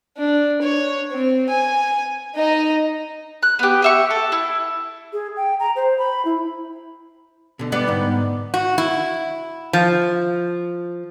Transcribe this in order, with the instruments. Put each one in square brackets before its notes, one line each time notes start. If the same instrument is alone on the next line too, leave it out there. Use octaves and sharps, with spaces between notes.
[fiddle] D4
C#5
C4
G#5
D#4 D#5
[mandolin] F#6
B3 G4
G4 E5 C#6
A4
E4
[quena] G#4
G5
A#5
C5
B5
E4
[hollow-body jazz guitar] B2 D3
[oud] G3 B3 D5
[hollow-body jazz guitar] G#2 D#4
[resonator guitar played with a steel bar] F#4
E4
F3